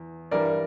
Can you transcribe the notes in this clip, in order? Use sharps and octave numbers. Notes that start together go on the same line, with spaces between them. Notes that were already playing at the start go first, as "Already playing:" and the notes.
Already playing: E2
G2 E3 G3 A#4 D5